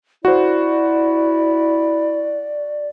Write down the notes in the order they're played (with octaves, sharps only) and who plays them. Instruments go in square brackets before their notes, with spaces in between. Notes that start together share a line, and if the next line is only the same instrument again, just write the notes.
[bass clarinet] E4 [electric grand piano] F#4 C5 [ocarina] D5